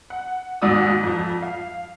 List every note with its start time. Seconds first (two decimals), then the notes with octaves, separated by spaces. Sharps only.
0.10 F#5
0.62 D#2 G#2 F#4 D5 D#6 E6
1.03 F2 F3
1.42 F5